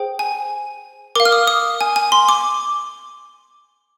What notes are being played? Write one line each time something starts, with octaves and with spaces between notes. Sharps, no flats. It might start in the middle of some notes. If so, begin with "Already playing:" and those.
Already playing: G#4 C5 G5
G#5
A#4 F5 D6
F6
D#6
D#6
G#5
G#5
C6
D6